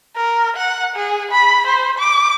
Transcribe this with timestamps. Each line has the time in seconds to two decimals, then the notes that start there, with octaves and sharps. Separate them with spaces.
0.17 A#4
0.57 F#5
0.96 G#4
1.31 B5
1.67 C5
1.99 D6